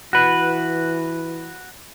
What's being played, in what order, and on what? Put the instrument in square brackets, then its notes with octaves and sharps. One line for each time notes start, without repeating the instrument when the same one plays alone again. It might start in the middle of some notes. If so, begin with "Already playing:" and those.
[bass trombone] E3 [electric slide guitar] F#4 B4